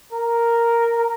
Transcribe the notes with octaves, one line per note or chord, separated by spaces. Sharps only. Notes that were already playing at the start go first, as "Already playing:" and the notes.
A#4